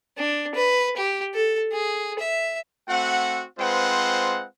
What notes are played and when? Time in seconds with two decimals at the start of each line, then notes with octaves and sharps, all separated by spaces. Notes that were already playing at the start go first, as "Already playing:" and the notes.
0.18 D4
0.55 B4
0.96 G4
1.35 A4
1.72 G#4
2.19 E5
2.89 A3 C4 F#4 F#5
3.58 G#3 C4 F4 B4 C5 F#5